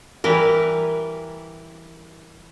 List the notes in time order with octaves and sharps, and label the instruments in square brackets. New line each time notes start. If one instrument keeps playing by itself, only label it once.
[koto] E3 G3 B4 [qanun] A#4